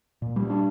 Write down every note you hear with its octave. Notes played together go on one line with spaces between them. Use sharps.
A#2
G3
D4